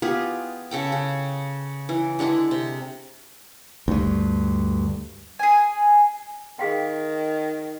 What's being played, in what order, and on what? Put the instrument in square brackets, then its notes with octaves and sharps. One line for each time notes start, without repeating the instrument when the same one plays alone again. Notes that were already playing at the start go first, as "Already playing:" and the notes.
[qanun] B3 F4 G4 G#4
C#3 A4 G5
C#3
E3
D3 G#3 D4 E4
C3
[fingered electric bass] D2 G2
[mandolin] G#4 G#5
[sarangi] D#3 [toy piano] G#4 F5 G5